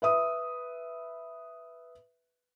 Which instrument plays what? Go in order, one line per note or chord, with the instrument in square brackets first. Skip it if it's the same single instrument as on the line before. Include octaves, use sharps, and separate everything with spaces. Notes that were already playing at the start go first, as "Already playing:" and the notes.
[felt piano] B4 E5 D#6